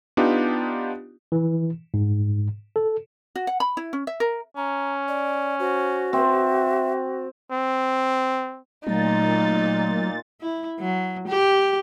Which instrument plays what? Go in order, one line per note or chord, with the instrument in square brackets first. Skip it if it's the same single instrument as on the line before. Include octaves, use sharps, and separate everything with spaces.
[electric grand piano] B3 D4 D#4 F4 G4
[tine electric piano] E3
G#2
A4
[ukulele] F#4
F#5
B5
E4
C#4
E5
A#4
[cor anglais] C#4 [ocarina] A#5
[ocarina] D5
[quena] F#4 [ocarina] C5
[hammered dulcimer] C4 [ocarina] E5
[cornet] C4
[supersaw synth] A#2 A6 [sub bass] F#3 [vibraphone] A3 A#5 [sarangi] D#4
[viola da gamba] E4
F#3
G4